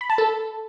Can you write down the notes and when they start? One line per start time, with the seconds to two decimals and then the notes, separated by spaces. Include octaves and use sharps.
0.01 B5
0.10 A5
0.18 A4